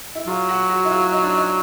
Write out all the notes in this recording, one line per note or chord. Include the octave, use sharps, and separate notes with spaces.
E4
F#3 F4
F#4
F#4
E4
F4
D#4
D4
D#4